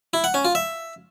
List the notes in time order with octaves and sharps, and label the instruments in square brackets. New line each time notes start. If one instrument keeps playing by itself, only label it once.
[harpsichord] E4
F#5
C#4
F4
E5